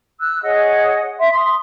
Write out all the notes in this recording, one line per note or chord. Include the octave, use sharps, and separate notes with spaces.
E6 F#6
G#4 C#5 D#5 F#5
E5 C6
C6 D#6